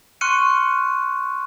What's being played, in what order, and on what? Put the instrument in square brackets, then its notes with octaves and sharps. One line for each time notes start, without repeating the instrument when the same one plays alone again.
[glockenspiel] C6 C#6 F6 F#6 C#7 D#7